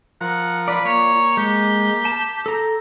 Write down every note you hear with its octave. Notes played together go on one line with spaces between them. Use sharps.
F3 A#4 F#5
F4 B4 D5
A#3 C#5
G#3 G4
A5
A4 A#5